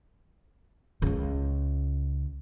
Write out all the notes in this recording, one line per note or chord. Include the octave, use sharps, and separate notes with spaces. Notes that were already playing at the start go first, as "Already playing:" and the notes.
C#2 C#3